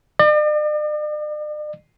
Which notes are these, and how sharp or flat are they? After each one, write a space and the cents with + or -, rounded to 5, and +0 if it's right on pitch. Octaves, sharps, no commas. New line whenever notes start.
D5 +45